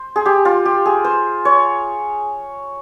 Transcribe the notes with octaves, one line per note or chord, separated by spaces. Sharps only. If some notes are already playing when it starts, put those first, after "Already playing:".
Already playing: C5
G#4
G4
F4
G4
G#4
C5
C#5